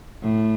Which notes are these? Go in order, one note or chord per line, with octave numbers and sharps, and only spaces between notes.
A2